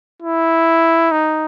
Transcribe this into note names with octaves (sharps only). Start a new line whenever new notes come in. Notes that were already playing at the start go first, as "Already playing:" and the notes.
E4
D#4